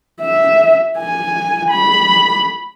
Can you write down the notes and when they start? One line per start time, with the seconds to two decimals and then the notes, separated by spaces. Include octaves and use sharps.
0.21 E5
0.98 G#5
1.71 B5